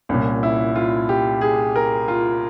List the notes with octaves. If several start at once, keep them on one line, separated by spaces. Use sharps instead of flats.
C2 A#2 C#4
E4
F4
G4
G#4
A#4
F4